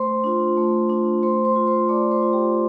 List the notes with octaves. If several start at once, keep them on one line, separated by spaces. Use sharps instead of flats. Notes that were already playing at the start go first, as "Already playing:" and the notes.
Already playing: A3 C5 C6
D4 F4
A3
D4 F4
A3 C5 C6
C5 C6
F4
C5 C6
A3 D5 D6
C5 C6
F4
G4 G5